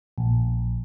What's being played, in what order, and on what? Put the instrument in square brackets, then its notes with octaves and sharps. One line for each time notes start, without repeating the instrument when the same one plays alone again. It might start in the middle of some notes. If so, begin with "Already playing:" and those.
[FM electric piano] A#1